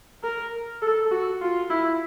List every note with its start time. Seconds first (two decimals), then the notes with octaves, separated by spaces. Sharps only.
0.23 A#4
0.82 A4
1.11 F#4
1.41 F4
1.70 E4